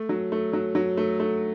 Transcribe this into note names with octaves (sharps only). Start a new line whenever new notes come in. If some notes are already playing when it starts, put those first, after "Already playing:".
Already playing: A3
F#3
A3
F#3
F#3
A3
A3